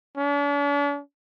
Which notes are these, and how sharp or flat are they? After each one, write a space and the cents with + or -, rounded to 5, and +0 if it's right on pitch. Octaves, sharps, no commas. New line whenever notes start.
D4 -45